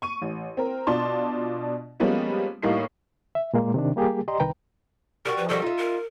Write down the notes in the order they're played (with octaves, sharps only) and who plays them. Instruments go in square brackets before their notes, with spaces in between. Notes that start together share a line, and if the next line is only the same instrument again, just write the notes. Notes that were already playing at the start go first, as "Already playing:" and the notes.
[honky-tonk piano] C#6 D#7
A1
C4 A#4
B2 D4 F4 D5 A5 C6
F3 G3 G#3 A#3 B3 C#4
A2 G3 A#3 D#4 C7
[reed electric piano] E5
A#2 G#3 A#3
C3 D#3 D4
G3 A#3 G4 G#4
G4 D5 D#5 A#5 C6
C2 D#3 B4 G5 A#5
[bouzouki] G3 F#4 [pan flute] A#4
[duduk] F3 [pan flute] B4
[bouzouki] D#3 G3 F#4 [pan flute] A4
[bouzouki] D#4 E5 [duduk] F4
[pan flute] A#4